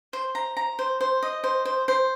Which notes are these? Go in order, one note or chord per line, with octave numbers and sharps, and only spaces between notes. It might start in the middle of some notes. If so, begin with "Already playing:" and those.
C5
A#5
A#5
C5
C5
D#5
C5
C5
C5